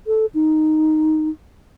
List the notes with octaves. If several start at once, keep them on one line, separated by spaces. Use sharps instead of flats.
A4
D#4